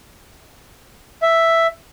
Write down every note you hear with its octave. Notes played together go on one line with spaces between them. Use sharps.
E5